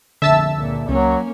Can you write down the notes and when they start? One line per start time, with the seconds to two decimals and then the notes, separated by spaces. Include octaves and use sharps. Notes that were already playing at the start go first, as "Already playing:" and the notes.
0.22 F1 A#1 D3 E5 A5 E6
0.53 C#2 A#2
0.89 C#2 F#3 A#3 C#4